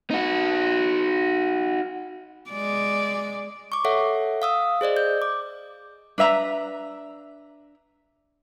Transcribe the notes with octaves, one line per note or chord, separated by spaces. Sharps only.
D#4 F#4
G#3 D5
C#6 D6
A4 C#5 E5 F#5
F5 D#6 E6
G#4 C5 D5 D#5
G6
D6
D4 B4 E5 A#5